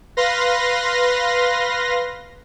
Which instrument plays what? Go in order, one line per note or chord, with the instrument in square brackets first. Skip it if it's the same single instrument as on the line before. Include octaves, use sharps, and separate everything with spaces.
[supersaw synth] B4 F5 C6 A#6